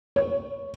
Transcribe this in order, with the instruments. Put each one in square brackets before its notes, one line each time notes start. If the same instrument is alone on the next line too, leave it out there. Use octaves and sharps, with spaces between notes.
[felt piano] C#5